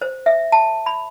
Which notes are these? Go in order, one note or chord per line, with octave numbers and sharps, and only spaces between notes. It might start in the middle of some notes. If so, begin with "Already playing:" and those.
C5
E5
A5
B5